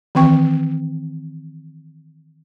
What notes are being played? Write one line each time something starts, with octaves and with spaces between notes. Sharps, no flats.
D#3 E3 C4 G5 C#6